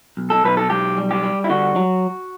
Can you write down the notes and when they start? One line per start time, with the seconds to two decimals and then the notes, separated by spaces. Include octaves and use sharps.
0.17 B1
0.30 A4
0.45 B1 B4
0.57 A4
0.70 B1 G4
0.98 G3
1.11 G4
1.23 G3
1.44 E4
1.50 D3 F#4
1.76 F#3